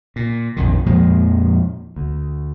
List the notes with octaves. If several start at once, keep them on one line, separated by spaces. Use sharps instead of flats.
A#2
A#1 F2 D#3
F2 A#2 F3 G#3
D2